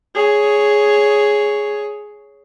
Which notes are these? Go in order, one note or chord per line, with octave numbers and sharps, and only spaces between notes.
G#4 C#5